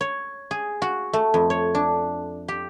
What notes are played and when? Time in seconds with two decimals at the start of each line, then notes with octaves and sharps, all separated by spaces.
0.01 C#5
0.51 G#4
0.82 F#4
1.13 A3
1.34 F2
1.50 C#5
1.75 D4
2.48 G4